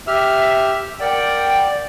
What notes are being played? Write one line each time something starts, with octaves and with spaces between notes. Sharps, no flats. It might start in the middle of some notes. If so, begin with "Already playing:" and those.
G4 E5 F6
A#4 D5 F#5 G5